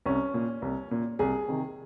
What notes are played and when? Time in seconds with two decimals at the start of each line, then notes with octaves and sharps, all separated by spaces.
0.06 C2 C#4
0.34 A#2
0.62 C2
0.91 A#2
1.19 C2 G#4
1.48 C3 D#3